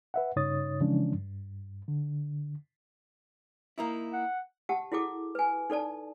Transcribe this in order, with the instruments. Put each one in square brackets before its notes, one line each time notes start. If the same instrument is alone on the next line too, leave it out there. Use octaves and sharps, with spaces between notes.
[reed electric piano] B4 E5 F#5
G2 C#3 D#4 C#5 D#6 A6
C#3 E3 F3 G#3 C#4 D4
G2
D3
[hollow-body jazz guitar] A#3 D#4 E4
[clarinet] F#5
[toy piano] G4 F#5 A5
E4 F#4 G#4 A4 D6
B4 G#5
D#4 A4 D5 A5